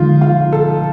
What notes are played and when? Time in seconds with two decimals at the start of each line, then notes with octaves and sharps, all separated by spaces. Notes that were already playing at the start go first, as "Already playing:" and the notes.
Already playing: D3 F3 G#3 D#4 F4
0.21 F4
0.53 A4